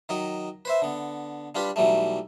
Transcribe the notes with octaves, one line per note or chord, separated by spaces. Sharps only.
D#3 F#3 D#5
B4 C5 E5
D3 B3
G3 D4 F4 G4 B4
B1 E3 F#3 G3 A3